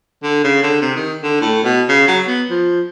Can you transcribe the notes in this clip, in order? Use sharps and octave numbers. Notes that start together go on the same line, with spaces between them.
D3
C#3
D3
C3
D#3
D3
A2
B2
C#3
F#3
B3
F3